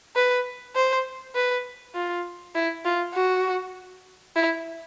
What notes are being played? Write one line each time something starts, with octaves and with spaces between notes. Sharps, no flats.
B4
C5
B4
F4
E4
F4
F#4
E4